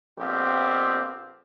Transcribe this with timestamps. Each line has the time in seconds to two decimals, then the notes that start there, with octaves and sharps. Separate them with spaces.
0.18 A#1 F2 B3 C4 F4 G4